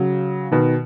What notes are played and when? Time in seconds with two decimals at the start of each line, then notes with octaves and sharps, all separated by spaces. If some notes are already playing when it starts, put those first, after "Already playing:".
Already playing: C#3 F#3
0.51 B2 D#3